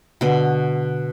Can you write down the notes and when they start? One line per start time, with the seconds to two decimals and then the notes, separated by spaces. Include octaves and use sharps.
0.21 B2 D3